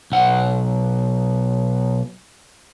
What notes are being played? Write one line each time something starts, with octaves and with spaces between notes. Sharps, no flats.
B1 F#5